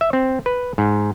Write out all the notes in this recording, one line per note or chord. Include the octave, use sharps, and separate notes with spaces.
E5
C4
B4
G#2